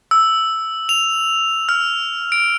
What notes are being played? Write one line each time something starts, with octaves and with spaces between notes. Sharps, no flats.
E6
F7
F6
D7